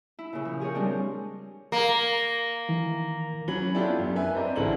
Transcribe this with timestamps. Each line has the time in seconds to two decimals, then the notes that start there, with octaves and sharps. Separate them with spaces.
0.19 E4
0.33 A#2 C#3
0.45 F3
0.60 G4 G#4 A#4 C#5
0.75 G3 G#3 C4 D4
1.72 A#3
2.69 D#3 E3
3.48 F#3 C#4 B5 F#7
3.74 B3 D4 E4 F4 G4 A4
3.98 F#2
4.15 A#4 B4 E5 G#5
4.35 C4 D4 G4 D#5 A#5
4.56 A1 D3 G#3 E4 A4 F#7